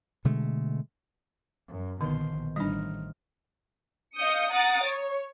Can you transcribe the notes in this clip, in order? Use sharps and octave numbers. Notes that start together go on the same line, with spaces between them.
B2 D3 G#3 A3
F#2
A#1 B2 D3 D#3 C5
A1 G3 D4 D#4 F6 A#6
D#5 F5 D#6 G6 C#7
F#5 A#5 D#6 A6 D7
C#5